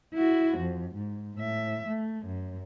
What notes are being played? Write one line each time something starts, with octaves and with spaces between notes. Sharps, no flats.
E4 F#4
F2
G#2
A2 E5
A3
F#2